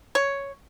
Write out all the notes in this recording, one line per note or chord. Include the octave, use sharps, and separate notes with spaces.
C#5